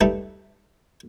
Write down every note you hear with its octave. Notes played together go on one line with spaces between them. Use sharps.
G3 A3 D#4 A4 B4